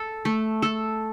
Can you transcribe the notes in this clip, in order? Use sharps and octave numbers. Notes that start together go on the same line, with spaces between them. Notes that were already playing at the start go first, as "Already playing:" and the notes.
Already playing: A4
A3
A4